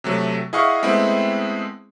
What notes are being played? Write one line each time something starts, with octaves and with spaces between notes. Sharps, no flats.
C3 F#3 A3
E4 G#4 D#5 F5 F#5 C#6
G#3 A3 B3 C4 E4